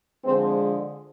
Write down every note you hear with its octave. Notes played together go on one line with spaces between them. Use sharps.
D3 F3 G#3 C4